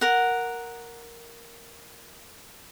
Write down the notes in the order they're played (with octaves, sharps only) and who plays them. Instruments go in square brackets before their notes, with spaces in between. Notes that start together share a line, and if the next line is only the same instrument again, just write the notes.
[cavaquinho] A#4 F#5